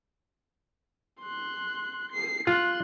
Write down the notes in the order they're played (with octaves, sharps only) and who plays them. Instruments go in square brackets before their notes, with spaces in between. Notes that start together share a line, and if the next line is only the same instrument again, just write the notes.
[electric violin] C6 F#6
C7
[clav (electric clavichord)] F4 [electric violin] C6 F#6